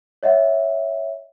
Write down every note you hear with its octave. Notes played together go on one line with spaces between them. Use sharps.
C#5 D#5 E5 F#5